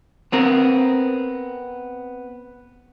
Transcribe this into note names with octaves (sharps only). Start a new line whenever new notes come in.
B3 C4 A#4